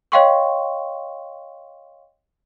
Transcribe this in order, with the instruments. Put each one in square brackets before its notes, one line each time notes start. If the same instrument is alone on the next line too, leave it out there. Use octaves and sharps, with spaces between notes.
[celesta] C#5 D#5 F5 G5 C6 C#6